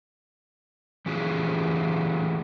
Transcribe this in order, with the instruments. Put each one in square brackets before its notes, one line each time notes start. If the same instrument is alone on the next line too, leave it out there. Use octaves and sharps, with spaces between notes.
[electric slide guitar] E3 A3 C#4 F4 G4 G#4